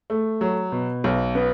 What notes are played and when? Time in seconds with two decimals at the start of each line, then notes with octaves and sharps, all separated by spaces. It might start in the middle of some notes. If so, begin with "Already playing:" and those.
0.10 A3
0.41 F#3
0.72 B2
1.04 B1
1.35 B3